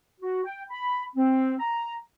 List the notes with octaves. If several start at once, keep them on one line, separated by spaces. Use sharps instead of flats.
F#4
G5
B5
C4
A#5